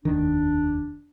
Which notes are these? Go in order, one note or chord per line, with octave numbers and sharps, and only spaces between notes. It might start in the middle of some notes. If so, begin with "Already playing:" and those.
F1 D#2 D#3 D4